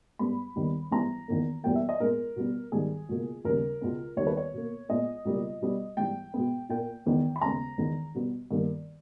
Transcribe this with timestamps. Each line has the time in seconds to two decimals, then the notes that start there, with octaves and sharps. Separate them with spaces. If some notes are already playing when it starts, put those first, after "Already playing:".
0.19 G#2 G3 B3 B5
0.56 D#2 D#3 G3 B3
0.91 G#2 E3 G3 B3 A#5
1.28 E2 D#3 A#3
1.63 E2 B2 G3 A#3 G5
1.75 E5
1.89 D#5
2.00 A#2 G#3 B3 A#4
2.36 B2 G3 B3
2.72 G#2 D#3 G3 G#4
3.09 C#2 B2 A#3
3.45 D#2 C#3 G3 A#4
3.81 C#2 B2 G#3 B3
4.17 D#2 D#3 G3 A#3 C#5
4.27 B4
4.37 C#5
4.54 B2 A#3
4.89 A#2 G#3 B3 D#5
5.25 C#2 B2 G3 A#3
5.61 B2 G3 B3
5.97 G#2 E3 G3 G5
6.34 B2 G#3 B3
6.69 A#2 A#3 G5
7.05 E2 D#3 G#3 B3
7.36 B5
7.41 D#2 C#3 G#3 B3 A#5
7.78 E2 D#3 G#3 B3
8.15 B2 G3 B3
8.51 G2 D#3 A#3